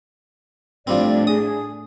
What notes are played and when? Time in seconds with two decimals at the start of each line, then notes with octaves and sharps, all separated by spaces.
0.87 A2 F3 G3 C4 D4 D5
1.27 G#4 G#5 D#6